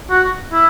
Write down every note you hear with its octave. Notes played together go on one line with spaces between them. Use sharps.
F#4
E4